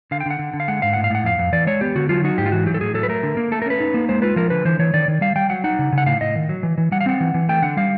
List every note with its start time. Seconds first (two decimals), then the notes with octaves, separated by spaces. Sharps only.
0.11 D3 F5
0.20 G5
0.26 D3
0.31 F#5
0.39 D3
0.53 D3
0.60 F5
0.68 G#3 F#5
0.82 G#2 F5
0.93 A2 F#5
1.04 F5
1.10 A2 F#5
1.24 F2 F5
1.38 F2
1.52 E3 D5
1.67 G#3 C#5
1.81 B3 G4
1.95 D3 F#4
2.09 F#3 F4
2.24 D#4 F#4
2.38 G#2 G4
2.46 F4
2.52 E3 F#4
2.66 F#3 G4
2.74 A4
2.81 A2 G#4
2.94 F#3 A4
3.03 B4
3.08 A3 A#4
3.23 D3
3.37 A#3
3.52 A3 A4
3.62 A#4
3.66 C#4 B4
3.80 D#4
3.94 A#3
4.09 G#3 C5
4.22 F4 B4
4.36 F3 A#4
4.50 D3 B4
4.65 E3 C5
4.79 E3 C#5
4.94 D#3 D5
5.08 D#3
5.21 G3 F5
5.36 G3 G5
5.50 F#3 F#5
5.64 D#4 F#5
5.79 C#3
5.92 C#3
5.98 F#5
6.06 A2 F5
6.21 A2 D#5
6.36 D#3
6.49 F#3
6.63 E3
6.78 E3
6.92 G3 F#5
7.01 F5
7.06 C4 F#5
7.20 E3
7.34 E3
7.49 A3 G5
7.62 D3 F#5
7.77 G3 F5